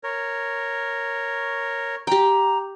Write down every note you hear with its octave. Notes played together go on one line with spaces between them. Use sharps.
A#4 C#5
G4 G5 A#5